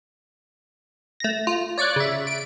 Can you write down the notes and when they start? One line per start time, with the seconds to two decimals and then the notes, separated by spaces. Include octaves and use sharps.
1.20 A3 A#6
1.47 F4
1.78 C#5 D5 C#6 D6 F#6
1.96 C#3 E5
2.27 D7